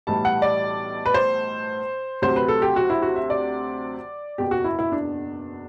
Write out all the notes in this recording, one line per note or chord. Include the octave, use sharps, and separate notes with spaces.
B1 A2 E3 G3 A5
F#5
D5
B4
C5
D2 C3 F#3 C5
B4
A4
G4
F#4
E4
F#4
E5
D5
F#1 E2 B2 G4
F#4
E4
E4
D4